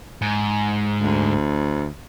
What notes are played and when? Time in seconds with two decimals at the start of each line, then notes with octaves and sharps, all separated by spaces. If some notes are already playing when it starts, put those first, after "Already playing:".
0.22 G#2
1.01 D2